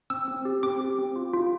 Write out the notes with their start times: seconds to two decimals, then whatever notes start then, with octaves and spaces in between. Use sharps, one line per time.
0.10 C4 E6
0.28 C4
0.45 G4
0.63 C4 D6
0.81 G4
0.98 C4
1.16 F4
1.34 F4